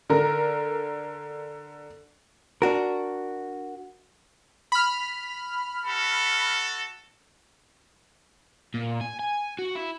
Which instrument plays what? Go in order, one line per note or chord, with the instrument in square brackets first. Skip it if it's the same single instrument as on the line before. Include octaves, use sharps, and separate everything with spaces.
[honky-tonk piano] D3 A#4
[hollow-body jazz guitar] D4 F#4 A#4
[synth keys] B5 F6
[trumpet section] F#4 A4
[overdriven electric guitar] A#2
G#5
G#5
F#4
E4